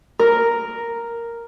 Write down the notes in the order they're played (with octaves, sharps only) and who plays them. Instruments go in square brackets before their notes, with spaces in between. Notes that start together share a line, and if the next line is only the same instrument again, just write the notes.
[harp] A#4